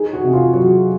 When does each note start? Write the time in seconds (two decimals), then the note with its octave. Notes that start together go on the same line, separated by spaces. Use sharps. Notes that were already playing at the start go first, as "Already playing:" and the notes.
Already playing: D#4 G#4
0.13 F#4
0.24 C3
0.33 F4
0.53 F#3 F#4